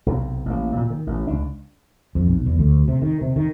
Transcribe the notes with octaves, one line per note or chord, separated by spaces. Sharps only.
B1 C3
A1 A#3
A#2
D#3
A1
C#2 D4
F2
B1
E2
D2
C3
D#3
C3
D#3